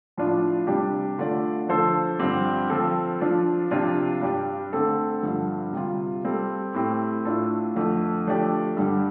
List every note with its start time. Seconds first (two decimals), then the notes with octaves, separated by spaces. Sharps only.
0.17 A2 F3 D4 F4 D5
0.67 C3 G3 D4 G4
1.19 D3 A3 F4 D5
1.69 F3 D4 A4 C5
2.19 G2 D3 F3 C4 G4
2.70 F3 C4 A4
3.21 F3 D4 F4
3.71 C3 F3 D4 F4
4.21 G2 G3 D4 G4
4.73 D3 A3 C4 A4
5.23 G2 D3 F3
5.73 C3 G3 F4
6.24 G3 C4 A4
6.74 A2 A3 C4 G4
7.25 A2 A3 D4 F4 A4
7.75 F2 D3 A3
8.27 F3 A3 D4 G4 D5
8.77 G2 D3 G3